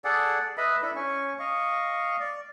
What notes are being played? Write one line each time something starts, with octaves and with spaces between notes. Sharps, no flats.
G#4 A4 D5 F#5
B4 D#5 E5 B5
D4 E4 A4 B5
C#4 G#5 C#6
D#5 F5 C#6
D5